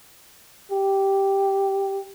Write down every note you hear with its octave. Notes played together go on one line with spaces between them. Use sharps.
G4